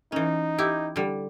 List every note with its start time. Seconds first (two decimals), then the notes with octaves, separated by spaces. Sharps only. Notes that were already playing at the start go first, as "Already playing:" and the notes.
0.12 E3 C#4 D#4
0.58 E4 G4
0.96 D3 G3